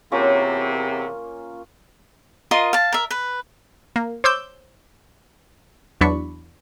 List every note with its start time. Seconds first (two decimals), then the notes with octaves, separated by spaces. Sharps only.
0.12 E2 C3 A#3 C#4 F4
2.51 F4 A#4 D#5 C6
2.73 F5 A5
2.93 A#4 E5
3.11 B4
3.96 A#3
4.24 C5 C#5 D6 E6 G6
6.01 E2 F#3 D4 B5 C#6